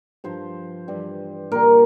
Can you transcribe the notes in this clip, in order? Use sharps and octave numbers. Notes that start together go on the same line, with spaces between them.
G2 F3 C5
G2 E3 G3
A#2 G3 A#4